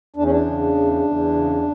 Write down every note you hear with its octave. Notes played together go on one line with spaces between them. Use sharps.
E2 D4
C#4
D4
C#3
E2
E2
C#3